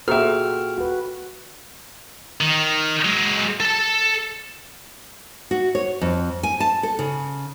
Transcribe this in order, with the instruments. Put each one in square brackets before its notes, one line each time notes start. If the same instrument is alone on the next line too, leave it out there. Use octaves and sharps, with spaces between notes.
[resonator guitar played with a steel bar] A#2 E5 [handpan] F#4 [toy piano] G#4 A4 [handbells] G5 F6
[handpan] F#4 B4
[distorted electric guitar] D#3
F#3 G#3
A4 A5
[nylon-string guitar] F#4
C#5
F2
G#5
A5
A4
C#3